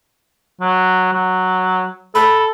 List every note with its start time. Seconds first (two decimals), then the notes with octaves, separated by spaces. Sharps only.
0.61 F#3
1.12 F#3
2.15 A4 B5